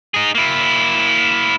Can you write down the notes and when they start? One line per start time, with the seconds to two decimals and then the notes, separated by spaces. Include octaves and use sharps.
0.14 D#4 G#4
0.35 A#3 E4